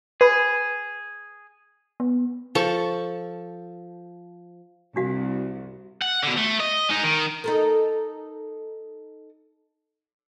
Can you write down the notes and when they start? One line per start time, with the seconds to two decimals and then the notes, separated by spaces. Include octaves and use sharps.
0.21 G#4 B4 B5
2.00 B3
2.55 F3 A4 A5 C#6
4.96 C2 D4 F#4 F5
6.01 F#5
6.23 B2 D3
6.37 A3
6.60 D#5
6.90 G#3 D#4
7.04 D#3
7.44 D#4 A4 A#4